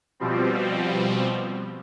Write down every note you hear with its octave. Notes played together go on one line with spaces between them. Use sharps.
B2 F3 G3 C4